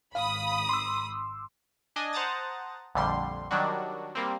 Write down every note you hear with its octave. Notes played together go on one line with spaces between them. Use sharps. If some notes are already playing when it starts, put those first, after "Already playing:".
G#1 F5 B5 D#6
C6 D6 E6
D4 D#5 G#5
C5 F#5 A5 A#5 D#6 A6
A#1 F2 D3 G3 C6
D#3 F#3 G3 D4 F#4
G3 A#3 C4